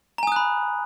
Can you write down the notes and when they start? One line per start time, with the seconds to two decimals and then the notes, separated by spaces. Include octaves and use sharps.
0.18 A#5
0.23 G#5
0.27 D#6
0.32 F#6
0.36 B5